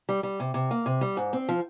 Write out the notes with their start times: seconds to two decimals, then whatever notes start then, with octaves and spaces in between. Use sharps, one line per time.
0.09 G3
0.23 G3
0.40 C3
0.54 C3
0.71 A#3
0.86 C3
1.01 G3
1.17 G#2
1.33 C4
1.49 F3